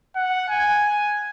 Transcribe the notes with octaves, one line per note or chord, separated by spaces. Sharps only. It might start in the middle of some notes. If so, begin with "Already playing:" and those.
F#5
G#5